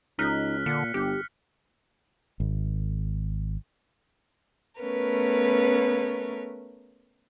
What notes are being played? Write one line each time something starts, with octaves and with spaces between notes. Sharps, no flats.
C#2 D#4 F6 F#6 B6
A#2 D3 C#7
G1 G4
G#1
A3 B3 C#4 A#4 B4